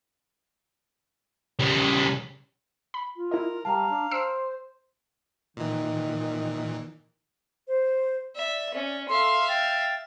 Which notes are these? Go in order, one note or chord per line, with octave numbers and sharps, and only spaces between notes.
C#3 G3
B5
F4
E4 A#4 D#5
G3 F5 A5 A#5
D4
C5 E6 C7 D7
A#2 D#3 E3
C5
D5 E5
C#4 D5
A4 E5 F5 C6
G5 A6